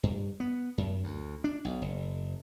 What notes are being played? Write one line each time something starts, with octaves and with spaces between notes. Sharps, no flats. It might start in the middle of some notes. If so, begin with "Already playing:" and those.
G2
B3
F#2
D2
D4
B1
F#1